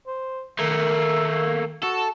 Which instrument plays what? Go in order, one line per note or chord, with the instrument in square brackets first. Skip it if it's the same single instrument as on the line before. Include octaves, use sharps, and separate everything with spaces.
[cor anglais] C5
[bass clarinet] D#3 [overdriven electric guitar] A3 A#3 [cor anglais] E5
[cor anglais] F#4 [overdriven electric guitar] A4